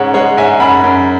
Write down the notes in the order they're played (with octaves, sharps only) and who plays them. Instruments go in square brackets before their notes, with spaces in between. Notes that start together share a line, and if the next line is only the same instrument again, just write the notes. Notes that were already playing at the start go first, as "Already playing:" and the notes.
Already playing: [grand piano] G#2 C#3 G#3 C#5 F#5
G#3 C#5 F#5
G#2 E5 G#5
F#2 F#5 B5
F#2